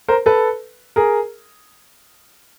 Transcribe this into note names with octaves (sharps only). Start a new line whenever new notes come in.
A#4 C5
A4 B4
G#4 A#4